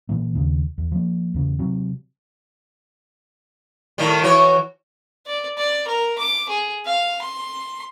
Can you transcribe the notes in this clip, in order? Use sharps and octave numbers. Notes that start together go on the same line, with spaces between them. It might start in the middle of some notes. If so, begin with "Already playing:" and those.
A#2 E3 A#3
D#2 C#3
E2
F3 A#3
E2 C#3
C3 F#3
A2 D#3 G3
E3 F#4 C#5
D5
D5
A#4
D6
G#4
F5
C6